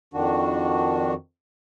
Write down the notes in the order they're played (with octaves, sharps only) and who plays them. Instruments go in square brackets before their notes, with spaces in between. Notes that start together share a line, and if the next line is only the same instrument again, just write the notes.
[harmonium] F2 D#3 D4 F#4